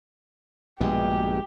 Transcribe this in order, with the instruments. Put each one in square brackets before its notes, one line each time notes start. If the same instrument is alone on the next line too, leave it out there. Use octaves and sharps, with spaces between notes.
[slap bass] A#1 G2 [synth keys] B2 G#3 [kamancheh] G4